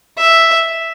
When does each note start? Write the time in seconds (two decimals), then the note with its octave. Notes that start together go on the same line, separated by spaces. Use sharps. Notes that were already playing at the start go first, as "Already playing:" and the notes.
0.18 E5